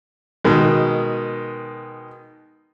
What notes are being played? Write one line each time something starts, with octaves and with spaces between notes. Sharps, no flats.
B2 D#3 G#3